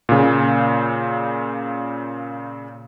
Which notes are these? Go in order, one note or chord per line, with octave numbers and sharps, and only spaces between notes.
A#2 C#3